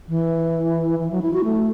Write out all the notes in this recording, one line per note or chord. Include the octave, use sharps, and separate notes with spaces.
E3
E3
F#3
E4
F#4
A3